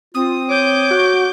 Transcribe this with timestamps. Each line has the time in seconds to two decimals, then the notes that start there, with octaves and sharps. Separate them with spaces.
0.15 C4 F4 D#6
0.50 C#5 D6 G6
0.91 F#4